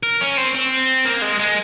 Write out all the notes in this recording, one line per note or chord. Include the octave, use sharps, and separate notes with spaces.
A#4
C#4
C4
C4
A#3
G#3
G#3